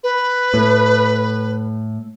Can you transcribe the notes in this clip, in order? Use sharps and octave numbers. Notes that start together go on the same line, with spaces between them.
B4
A2